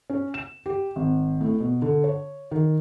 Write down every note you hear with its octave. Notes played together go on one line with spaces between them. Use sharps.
C#4
E7
G4
G#1
A2
B2
D3
C#5
D#3